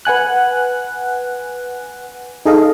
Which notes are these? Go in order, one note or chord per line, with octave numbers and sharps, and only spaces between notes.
B4 F#5 G#5 F#6
D#4 G#4 A4 D#5 F5